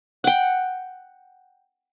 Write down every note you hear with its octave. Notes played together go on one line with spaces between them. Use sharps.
F#5 G5